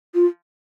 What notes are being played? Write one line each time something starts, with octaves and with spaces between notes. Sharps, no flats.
F4